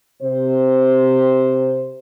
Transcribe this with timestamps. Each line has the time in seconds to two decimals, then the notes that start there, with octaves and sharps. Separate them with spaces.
0.23 C3 C5